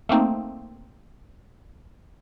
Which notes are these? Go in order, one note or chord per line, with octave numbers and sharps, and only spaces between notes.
A3 A#3 C4 D#4